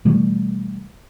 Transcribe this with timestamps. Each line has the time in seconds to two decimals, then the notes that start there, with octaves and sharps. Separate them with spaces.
0.05 B2 E3 G3 A3